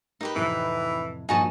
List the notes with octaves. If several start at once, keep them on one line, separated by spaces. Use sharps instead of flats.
D#4 G4 A#4 B4
F2 A2 C3 E3
G2 A#2 F3 D#4 F#4 G#5 A5